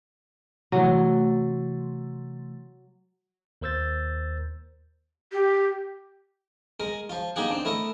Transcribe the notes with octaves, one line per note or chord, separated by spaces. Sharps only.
C3 E3 F#3 A3
D#2 A#4 C5 E6 G6 A6
G4
G#3 A#4
F3 F4
A#3 D#4 F4 G4 G#4 F#5
C4 D4
A3 E4 A#4 D#5